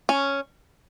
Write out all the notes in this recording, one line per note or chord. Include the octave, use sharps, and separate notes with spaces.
C#4